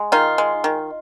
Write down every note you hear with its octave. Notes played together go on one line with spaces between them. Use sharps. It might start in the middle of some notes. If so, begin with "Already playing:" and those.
Already playing: G#3
D#3 D#4 F4
G#3
D#3